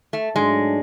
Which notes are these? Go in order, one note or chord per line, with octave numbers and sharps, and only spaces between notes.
A3
G#2 F#3 G#3 A3 D4